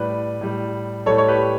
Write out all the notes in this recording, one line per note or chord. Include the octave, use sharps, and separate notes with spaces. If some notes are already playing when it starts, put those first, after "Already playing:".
Already playing: A2 G3 B4 D5
A2 G3
A2 G3 A4 C#5
C#5
G4 B4